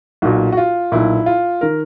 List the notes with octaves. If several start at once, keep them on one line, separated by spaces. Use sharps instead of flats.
B1 A#2 F#4
F#4
F4
B1 A#2 E4
F4
D#3 A#4